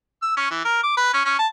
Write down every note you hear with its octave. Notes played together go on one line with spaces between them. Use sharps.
E6
C#4
E3
A#4
D6
B4
C#4
C#4
A5